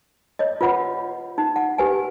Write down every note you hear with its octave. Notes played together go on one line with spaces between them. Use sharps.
C#5 D#5
F4 B4 F#5 B5
D#4
F#5
G4 B4 G#5